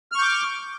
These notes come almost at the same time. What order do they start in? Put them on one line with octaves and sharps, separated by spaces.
F6 C#6 G6 D6